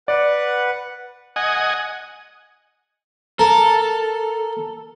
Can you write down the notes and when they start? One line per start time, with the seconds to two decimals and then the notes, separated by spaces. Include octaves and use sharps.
0.08 B4 D5 F#5
1.36 D#5 F#5 G#5
3.39 A4 A#4